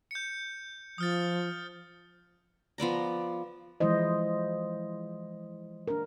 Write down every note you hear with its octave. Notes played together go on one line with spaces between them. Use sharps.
G6 C#7
F3 D#6 F6 A6
F3 B3 D5 A#5
E3 F3 G#3 E4 C5 D#5
D4 A#4